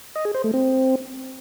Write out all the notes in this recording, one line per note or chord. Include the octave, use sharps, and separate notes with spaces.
D#5
G#4
C5
A3
C4